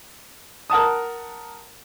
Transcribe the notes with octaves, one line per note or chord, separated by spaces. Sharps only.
A#4 F#5 A5 D#6